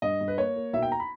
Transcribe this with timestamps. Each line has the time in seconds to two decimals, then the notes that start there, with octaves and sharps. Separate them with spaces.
0.02 G2 D#5
0.21 G2
0.28 B4
0.38 A#3 C#5
0.56 A#3
0.73 B1 E5
0.82 G5
0.92 A#5
1.00 B5